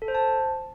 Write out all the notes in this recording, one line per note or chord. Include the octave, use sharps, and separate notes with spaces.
A4
C5
A5